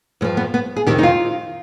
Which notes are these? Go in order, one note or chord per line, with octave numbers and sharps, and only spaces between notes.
G2 F3 G#3
B3
B3
G#4
F2 C3 D#3 G4
D#4
F4